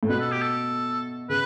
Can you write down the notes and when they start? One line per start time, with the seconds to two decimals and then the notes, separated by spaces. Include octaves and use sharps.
0.03 A2
0.09 B2 B4
0.20 A4
0.32 G4
0.42 A4
1.29 C#3 B4